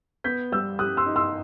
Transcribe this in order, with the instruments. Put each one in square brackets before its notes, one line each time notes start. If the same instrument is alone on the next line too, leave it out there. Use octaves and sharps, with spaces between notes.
[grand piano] B3 [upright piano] G6 B6
[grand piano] G3 [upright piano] E6 G6
[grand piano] G4 [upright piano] D#6 F#6
[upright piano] C6 E6
[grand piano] D#4
[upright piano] C6 E6